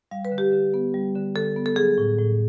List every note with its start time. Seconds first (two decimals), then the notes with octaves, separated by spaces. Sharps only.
0.11 G3 F5
0.25 B4
0.32 D3
0.38 G4
0.52 D3
0.74 B3
0.94 G3
1.15 D3
1.36 D3 A4
1.56 B3
1.66 A4
1.76 F#3 G#4
1.98 A2
2.18 A2